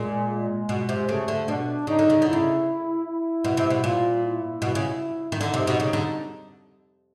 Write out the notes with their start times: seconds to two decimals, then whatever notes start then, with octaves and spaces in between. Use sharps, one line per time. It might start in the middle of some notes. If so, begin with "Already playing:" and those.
Already playing: A#2 G#3
0.30 G#3
0.69 B2
0.89 C3
1.09 C#3 A3
1.28 D3
1.48 B2 D4
1.87 C#3 D#4
1.99 D3
2.10 C#3
2.22 D3
2.27 E4
2.33 C#3
3.05 E4
3.44 B2
3.57 C3
3.70 B2
3.83 A#2 F4
4.23 E4
4.62 B2
4.75 C#3
5.32 D#3
5.41 D3 D#4
5.54 C3
5.67 B2
5.80 C#3
5.93 D3